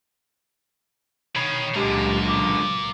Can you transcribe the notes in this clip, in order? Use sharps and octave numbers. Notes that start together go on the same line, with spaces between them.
D#3 C#5 B5
C#2 A#2 D3 F#3 G#3 F4 G4 A#4
D6